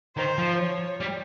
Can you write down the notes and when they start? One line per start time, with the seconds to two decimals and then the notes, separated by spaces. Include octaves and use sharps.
0.17 D#3 C5
0.38 F3
0.59 C#5
1.00 G3